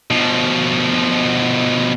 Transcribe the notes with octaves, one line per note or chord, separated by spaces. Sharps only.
B2 F3